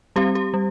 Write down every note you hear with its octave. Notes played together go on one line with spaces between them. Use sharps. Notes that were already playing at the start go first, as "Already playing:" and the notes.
G3 C4 G4
G4
G3